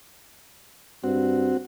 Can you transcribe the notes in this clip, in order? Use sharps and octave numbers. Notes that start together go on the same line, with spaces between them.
G2 C4 F#4